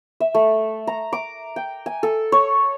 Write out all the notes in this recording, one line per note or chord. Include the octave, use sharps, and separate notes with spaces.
E5
A3
A#5
D6
G5
G#5
A4
C#5